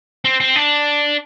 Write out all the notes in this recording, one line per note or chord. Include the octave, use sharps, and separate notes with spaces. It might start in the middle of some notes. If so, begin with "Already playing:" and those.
C4
C4
D4